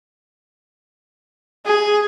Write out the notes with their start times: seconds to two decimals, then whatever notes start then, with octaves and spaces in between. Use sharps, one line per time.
1.66 G#4